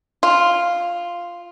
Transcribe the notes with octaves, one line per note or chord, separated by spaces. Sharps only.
F4